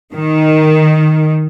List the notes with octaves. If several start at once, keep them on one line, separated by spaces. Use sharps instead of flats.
D#3